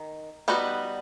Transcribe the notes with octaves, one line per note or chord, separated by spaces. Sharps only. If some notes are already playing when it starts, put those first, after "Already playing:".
Already playing: D#3
G3 B3 D#4 F#4 B4